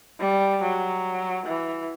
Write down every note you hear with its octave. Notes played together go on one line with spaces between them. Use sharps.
G3
F#3
E3